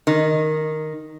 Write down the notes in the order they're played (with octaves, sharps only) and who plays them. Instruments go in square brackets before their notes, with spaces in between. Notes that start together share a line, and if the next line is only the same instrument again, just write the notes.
[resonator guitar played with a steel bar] D#3